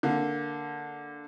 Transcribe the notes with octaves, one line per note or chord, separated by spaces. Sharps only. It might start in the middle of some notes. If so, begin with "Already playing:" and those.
D3 A#3